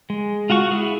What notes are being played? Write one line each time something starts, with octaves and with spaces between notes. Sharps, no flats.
G#3
F4 F#4 F#5 C#6
E4 G#4